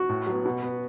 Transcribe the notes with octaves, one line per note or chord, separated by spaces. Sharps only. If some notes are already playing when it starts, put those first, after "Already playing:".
Already playing: F#4
A2
F#3 B3
B2
B3